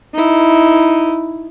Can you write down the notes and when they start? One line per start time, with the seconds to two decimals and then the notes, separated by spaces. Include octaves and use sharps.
0.14 D#4 E4